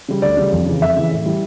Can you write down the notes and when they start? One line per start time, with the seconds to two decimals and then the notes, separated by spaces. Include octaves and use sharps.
0.09 C#3 G3
0.22 D2 D5
0.37 C#3 G3
0.52 F2
0.66 C#3 E3
0.81 F2 E5
0.97 C#3 E3
1.11 A2
1.26 E3 G3